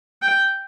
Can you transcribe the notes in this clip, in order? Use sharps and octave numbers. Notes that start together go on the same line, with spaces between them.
G5